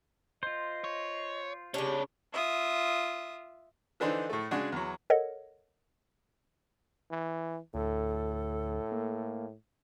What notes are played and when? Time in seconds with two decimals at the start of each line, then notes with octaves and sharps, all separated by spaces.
0.43 F4 C5 D#5
0.84 C#5
1.74 C#3 C#4 D4 G4 C#5
2.33 F4 E5 D#6
4.00 D3 E3 D4 D#4 C5
4.29 A2 A3
4.51 C#3 G#3 D4 F#4
4.72 E2 F#3
5.10 A4 A#4 C#5 D#5 F#5
7.11 E3
7.74 D2 A2 A4
8.92 A#3